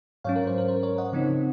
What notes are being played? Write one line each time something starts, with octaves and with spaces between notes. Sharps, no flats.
G#2 F#3 C#4 C#5 F5
A#4
C5
A#4
C5
A#4 C#5
D#5 F#5
C#3 F3 C4 D#4